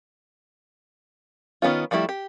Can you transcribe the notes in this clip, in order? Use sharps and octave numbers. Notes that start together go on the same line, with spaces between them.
D#3 B3 C#4 F4
F3 G3 A3 E4 G4
G4